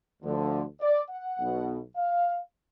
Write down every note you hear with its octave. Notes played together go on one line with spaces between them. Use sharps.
D2 D3 F3
D5
F#5
B1 B2
F5